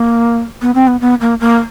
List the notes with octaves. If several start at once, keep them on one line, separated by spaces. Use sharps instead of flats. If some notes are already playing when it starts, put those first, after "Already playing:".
Already playing: A#3
B3
C4
B3
B3
A#3
A#3